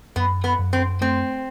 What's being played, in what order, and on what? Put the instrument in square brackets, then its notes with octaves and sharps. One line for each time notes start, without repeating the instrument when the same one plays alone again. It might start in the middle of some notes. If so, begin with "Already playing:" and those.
[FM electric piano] F#2 [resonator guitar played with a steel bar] B3
[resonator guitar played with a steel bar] B3
[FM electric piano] F#2
[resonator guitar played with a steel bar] C4
[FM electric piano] A3 [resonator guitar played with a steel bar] C4